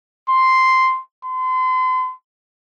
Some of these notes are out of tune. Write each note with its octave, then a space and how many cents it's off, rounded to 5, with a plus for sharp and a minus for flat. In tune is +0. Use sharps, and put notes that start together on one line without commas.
C6 -5
C6 -35